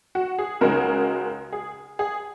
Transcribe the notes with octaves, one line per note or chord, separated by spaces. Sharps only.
F#4
G#4
C#2 C#3 G#3 D#4 F#4 A#4
G#4
G#4